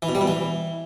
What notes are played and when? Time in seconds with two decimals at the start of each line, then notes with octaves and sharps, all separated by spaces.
0.02 E3
0.09 B2
0.15 G3
0.21 B2
0.27 E3